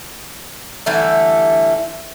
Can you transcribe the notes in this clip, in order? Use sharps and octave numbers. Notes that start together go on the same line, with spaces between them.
D3 E3 G3 A3